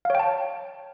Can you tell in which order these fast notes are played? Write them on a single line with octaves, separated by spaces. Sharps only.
F5 C#5 G5 A5